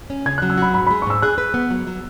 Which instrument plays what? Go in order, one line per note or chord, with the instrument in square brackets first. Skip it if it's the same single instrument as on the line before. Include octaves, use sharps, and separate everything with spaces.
[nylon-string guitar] C#4
[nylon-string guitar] C#3 [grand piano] G#6
[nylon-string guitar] F#3 [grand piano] F#6
[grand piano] E6
[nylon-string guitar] F#4 [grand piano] B5
[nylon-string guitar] G#2 [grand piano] B5
[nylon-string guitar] G#3 [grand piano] B5
[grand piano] C#6
[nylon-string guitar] G#2 [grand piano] E6
[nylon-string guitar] G#4 [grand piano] F#6
[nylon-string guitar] B4
B3
F#3
F#3